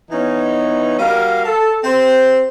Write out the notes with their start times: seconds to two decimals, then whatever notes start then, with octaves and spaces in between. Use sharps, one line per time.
0.11 E3 B3 C#4 D#4
0.99 G3 F#4 A#4 F5
1.45 A4
1.84 C4 G4 C5